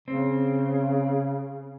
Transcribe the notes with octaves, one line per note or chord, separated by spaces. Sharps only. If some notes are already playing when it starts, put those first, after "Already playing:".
C#3 C4